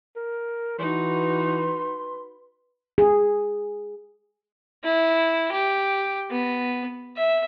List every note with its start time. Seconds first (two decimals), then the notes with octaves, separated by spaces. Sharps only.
0.16 A#4
0.79 E3 D#4 F#4 B4 C6
2.98 G#4
4.83 E4
5.51 G4
6.30 B3
7.16 E5